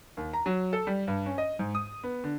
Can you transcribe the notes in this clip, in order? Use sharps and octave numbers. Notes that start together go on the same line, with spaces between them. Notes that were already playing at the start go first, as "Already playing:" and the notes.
D#2
A#5
F#3
A4
G3
G2
C#4
D#5
G#2
D#6
B3
D3